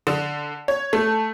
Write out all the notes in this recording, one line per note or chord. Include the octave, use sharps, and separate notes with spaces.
D3
C#5
A3